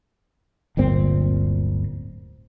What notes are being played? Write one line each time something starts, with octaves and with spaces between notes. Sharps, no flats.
D1 G1 A#2 C4